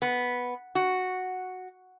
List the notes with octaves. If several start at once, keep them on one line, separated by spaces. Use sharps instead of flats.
B3
F#4